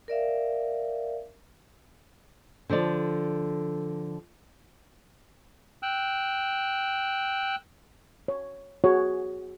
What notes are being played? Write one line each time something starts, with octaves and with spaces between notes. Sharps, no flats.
A#4 D5 E5 F5
D3 F3 A4 D5
G5 E6 F#6
C#5
F#4 G#4 C#5